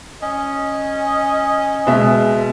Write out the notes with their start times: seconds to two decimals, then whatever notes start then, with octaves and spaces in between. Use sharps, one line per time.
0.21 C#4 D#5
1.87 B2 G#3 E5